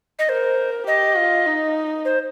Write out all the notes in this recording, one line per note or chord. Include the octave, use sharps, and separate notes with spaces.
D#5
A#4 C5
G4 D#5
F4
D#4
C5